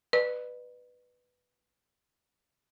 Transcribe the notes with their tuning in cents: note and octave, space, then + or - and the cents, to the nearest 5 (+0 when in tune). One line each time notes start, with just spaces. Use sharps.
B4 +0 D5 +45